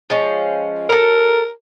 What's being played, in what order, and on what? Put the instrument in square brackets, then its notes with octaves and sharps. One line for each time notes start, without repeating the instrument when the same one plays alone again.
[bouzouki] F3 G#3 C#4
[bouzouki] A4 A#5 [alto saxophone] A#4